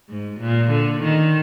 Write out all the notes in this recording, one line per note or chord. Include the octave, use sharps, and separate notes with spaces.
G#2
A#2
D3
D#3